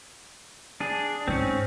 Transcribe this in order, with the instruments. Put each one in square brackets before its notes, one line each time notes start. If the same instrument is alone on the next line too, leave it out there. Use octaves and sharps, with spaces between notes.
[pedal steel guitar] D4 G#4
[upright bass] G#2 [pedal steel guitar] C4 C#4